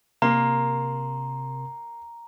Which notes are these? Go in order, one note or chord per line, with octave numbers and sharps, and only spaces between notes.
C3 A#3 A#4 A#5 C6